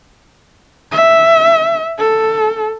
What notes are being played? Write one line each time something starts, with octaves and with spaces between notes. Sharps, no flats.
E5
A4